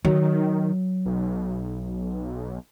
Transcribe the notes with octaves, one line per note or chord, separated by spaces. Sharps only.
D#3 F#3
B1